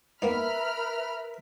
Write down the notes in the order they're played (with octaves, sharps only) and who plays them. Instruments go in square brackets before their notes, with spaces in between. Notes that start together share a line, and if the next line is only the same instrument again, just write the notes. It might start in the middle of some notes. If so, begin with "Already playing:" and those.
[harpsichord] A#3 B3 D#4 [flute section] A#4 B4 E5 [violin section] B5 F6